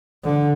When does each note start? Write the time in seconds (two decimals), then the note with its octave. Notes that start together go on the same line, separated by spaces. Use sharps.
0.24 D3